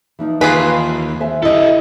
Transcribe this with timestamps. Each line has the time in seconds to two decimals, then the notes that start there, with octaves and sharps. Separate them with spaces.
0.19 E3 F3 D#4
0.41 D#2 F4 G#4 B4
1.20 C5 E5 G#5
1.43 E4 G4 A4 D#5